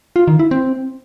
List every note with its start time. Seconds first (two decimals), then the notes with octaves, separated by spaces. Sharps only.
0.16 F4
0.28 D#3
0.39 E4
0.51 C4